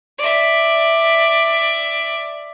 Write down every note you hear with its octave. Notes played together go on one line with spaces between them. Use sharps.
D5 E5